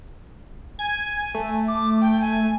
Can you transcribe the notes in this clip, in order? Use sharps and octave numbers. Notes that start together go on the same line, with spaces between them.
G#5 G#6
A3
D6
G5
G#5